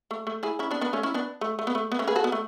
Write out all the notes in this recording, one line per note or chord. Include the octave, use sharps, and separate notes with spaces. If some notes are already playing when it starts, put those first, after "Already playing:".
A3
A3
E4 G#4
C#4 E4
B3 D4
B3 D4
A3 C#4
C#4 E4
B3 D4
A3
A3
B3
A3
B3
A3 C#4
G#4 B4
F#4 A4
B3
A3